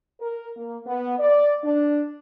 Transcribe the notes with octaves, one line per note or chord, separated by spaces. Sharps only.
A#4
A#3
B3
D5
D4